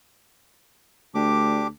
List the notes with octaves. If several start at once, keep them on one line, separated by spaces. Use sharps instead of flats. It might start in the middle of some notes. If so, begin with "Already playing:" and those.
D2 D4 G4 D6